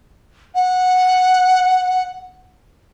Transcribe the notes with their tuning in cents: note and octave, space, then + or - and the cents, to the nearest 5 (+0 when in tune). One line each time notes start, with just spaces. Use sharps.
F#5 -10